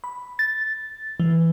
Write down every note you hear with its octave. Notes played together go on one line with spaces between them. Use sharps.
B5
A6
E3